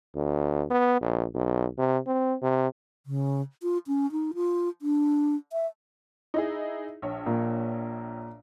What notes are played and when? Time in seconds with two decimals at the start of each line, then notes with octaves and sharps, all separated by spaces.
0.15 D2
0.70 B3
1.01 A#1
1.35 B1
1.78 C3
2.07 C4
2.42 C3
3.06 C#3
3.62 F4
3.87 C#4
4.12 D#4
4.34 F4
4.82 D4
5.53 E5
6.34 D#4 E4 G#4
7.02 A#1 C#5
7.26 A#2